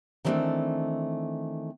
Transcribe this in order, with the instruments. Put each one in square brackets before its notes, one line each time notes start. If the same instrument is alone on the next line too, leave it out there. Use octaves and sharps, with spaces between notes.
[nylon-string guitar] D#3 E3 G3 A3 C4 D4